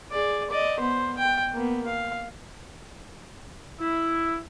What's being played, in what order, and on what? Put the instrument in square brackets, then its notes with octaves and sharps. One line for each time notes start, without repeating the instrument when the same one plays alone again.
[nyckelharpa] G#4 D5
D5 D#5
B3 C5
G5
A#3 B3
F5
[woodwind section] E4